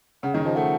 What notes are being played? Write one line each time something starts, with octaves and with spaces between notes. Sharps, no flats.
C#3 F#5
D#3 D#5
F3 D#5
A3 F#5